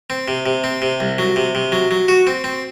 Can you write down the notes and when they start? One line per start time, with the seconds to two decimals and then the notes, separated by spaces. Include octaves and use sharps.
0.10 C4
0.28 C3
0.46 C3
0.64 C4
0.82 C3
1.00 C2
1.18 F#3
1.36 C3
1.55 C3
1.72 F#3
1.91 F#3
2.08 F#4
2.27 C4
2.44 C4